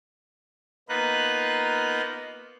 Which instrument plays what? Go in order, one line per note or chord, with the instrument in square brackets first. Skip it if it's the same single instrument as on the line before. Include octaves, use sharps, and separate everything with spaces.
[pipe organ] A#3 B3 D#4 F4 B4 F#6